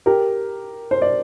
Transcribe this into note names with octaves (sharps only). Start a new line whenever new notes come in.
G4 A#4
C5
D5